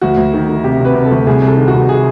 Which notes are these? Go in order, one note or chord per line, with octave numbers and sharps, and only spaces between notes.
D2 F#4
D2
D#3
D#3
C3 G4
C3 B4
C3
A4
D2
C2 G#4
C2
A4
D#3
F#4
C2
C3 G#4